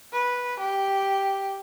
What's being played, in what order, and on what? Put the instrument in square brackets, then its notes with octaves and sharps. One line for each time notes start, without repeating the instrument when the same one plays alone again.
[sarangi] B4
G4